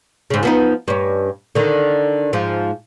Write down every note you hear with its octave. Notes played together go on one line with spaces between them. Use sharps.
G#2 C#3
F3 B3 D#4
G2 C#4
D3 D#3
G#2 F3